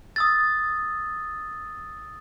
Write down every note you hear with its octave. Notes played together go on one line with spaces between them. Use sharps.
D#6 E6 A6